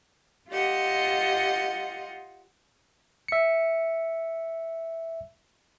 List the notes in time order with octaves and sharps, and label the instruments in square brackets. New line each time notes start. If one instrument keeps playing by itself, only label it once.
[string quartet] F4 G4 D#5 F#5
[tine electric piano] E5 C#7